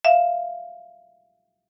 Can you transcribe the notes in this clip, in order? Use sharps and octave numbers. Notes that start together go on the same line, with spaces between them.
E5 F5